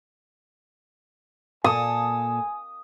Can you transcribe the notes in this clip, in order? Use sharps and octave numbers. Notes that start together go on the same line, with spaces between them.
A#2 A4 G#5 D#6